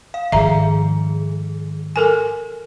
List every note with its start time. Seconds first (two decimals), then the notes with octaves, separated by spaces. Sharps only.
0.14 F5
0.32 G#2 D#3 F3 G#4 E5 A#5
1.96 A4 A#4 G#5